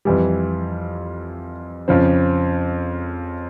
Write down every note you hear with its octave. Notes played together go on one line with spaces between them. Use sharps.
F2 E3 G3
F2 C#3 F3 C4